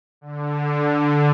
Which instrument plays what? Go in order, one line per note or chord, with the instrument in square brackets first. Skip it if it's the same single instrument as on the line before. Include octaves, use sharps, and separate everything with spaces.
[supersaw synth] D3